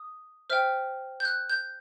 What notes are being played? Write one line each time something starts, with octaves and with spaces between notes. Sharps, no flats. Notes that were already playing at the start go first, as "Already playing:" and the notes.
Already playing: D#6
C5 E5 G5 F6
G6
F#6
G6